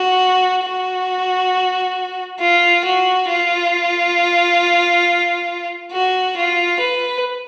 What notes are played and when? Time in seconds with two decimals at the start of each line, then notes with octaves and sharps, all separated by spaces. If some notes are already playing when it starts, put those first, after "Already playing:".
Already playing: F#4
0.64 F#4
2.40 F4
2.84 F#4
3.29 F4
5.92 F#4
6.37 F4
6.80 B4